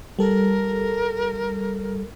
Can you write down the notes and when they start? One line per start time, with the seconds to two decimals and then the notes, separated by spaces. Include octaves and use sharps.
0.19 G3 A4 A#4